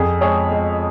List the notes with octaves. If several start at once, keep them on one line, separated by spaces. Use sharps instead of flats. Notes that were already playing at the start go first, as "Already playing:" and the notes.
Already playing: F2 G#4
G#3 G#4 C#5
G#3